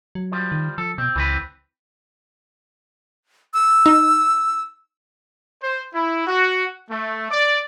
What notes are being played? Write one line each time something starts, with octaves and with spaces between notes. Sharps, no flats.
F#3
F3 G3
D#3
F3 A4
B2 C4
C#2 E3 C4 B4
E6
D#4
C5
E4
F#4
A3
D5